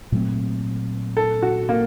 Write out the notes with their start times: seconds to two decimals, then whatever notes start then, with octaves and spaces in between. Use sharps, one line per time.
0.12 A#2 F#3 A3 C4
1.17 A4
1.42 F#4
1.69 A#3